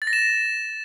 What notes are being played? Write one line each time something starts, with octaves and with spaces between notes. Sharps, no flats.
A6
A#6
E7